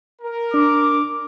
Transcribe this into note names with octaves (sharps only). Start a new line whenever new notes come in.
A#4
D4 D6